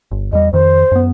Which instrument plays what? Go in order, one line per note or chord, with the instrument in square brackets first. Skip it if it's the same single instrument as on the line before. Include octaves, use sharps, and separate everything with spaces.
[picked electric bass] G1
[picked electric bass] E2 G3 [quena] D#5
[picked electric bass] F2 D#3 [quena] C5
[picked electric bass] F#2 B3